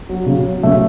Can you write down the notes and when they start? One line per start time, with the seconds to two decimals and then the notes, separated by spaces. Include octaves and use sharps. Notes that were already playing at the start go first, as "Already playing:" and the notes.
0.09 F#3
0.26 C#3
0.45 F#3
0.63 C#3 A3